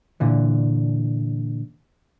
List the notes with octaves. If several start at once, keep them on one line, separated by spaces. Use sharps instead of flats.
A#2 D3 E3